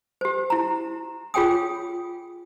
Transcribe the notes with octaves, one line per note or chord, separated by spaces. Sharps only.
G4 C5
E4 A#5
F4 G#4 C#5 G5 G#5 D#6